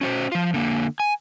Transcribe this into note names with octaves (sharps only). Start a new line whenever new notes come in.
C#4 F#4 C5
F3 F4
D3 A#3
G#5